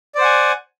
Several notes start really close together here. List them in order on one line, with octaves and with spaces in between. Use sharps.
D5 C5 F#5 G#5